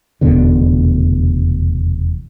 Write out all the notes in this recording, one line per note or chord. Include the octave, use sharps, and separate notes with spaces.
F1 E2 B2 D3